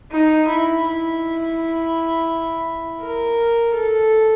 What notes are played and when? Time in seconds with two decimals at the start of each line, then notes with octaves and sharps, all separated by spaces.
0.12 D#4
0.47 E4
0.83 E4
3.01 A#4
3.74 A4